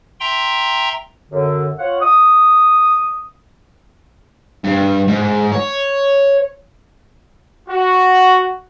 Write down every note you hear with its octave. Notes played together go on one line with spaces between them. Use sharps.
E5 G5 A#5 C6
F#2 D3
F4 C#5 F#5
D#6
G2
G#2
C#5
F#4